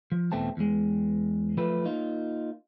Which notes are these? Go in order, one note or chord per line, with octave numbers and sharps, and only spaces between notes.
F3
E2 B2 A3 C4 A5
E2 G#3
F3 F#3 A3 B4
A#3 D#4 F4